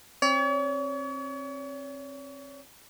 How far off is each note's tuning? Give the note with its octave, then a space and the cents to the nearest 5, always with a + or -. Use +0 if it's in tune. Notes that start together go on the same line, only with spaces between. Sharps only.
C4 +35 C#5 +40